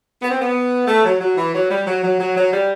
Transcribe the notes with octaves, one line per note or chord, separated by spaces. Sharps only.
B3
C4
B3
A3
F#3
F#3
E3
F#3
G3
F#3
F#3
F#3
F#3
G3